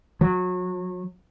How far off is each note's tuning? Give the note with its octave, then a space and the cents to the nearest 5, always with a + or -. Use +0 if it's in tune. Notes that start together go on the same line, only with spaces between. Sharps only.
F#3 -30